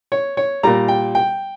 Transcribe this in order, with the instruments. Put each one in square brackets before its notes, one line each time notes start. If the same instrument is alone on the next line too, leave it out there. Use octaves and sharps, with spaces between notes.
[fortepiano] C#5
C#5
A#2 G3 A#5
G5
G5